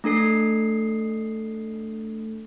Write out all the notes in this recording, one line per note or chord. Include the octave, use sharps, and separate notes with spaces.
A3 D4 A4 C7